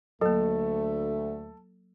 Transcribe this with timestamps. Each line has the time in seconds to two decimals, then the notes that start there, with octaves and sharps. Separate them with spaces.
0.21 D2 F#3 A3 A#3 A4